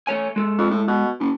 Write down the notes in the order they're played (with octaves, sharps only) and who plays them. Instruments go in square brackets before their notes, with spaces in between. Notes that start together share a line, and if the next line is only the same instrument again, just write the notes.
[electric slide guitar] A3 C#5 G#5
G#3 A4
[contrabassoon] F2
A2
B2
F#1